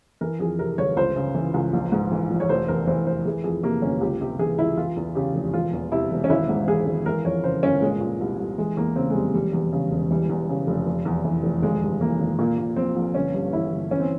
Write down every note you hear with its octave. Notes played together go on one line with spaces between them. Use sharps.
E3 A#4
F2 G#4
C3 A#4
G1 C#5
C#2 C5
C#3
E3
C#2
A#1
G#2
E3
A#1
C#5
F1 C5
E2 A#4
E3 C5
F1 C5
E3 G#4
F2 G#4
C3 A#3
G1 C#4
C#2 G4
C3 G4
E3 G#4
C#2 E4
E3 F4
E2
C#3 G4
F1
E1 F4
E2
C3 E4
E1
C#4
G#1 E4
G#2
E3 G#4
G#1
E3 A#4
F2 C#5
C#3 C5
G1 C#4
A#2 G#3
A#2
C2
C2
E3 G#3
E2 A#3
C#3 C4
G#3
F1 G3
E1 G3
E2
C#3
E1
E3 G3
E2
C#3
F1
F1
E2
E3
F1
G#1 G#3
G2
E3 A#3
G#1
A#2 A#3
A#2
A#1 C4
A#1
G1 C#4
G2
E3 E4
G1
E3 C#4
C4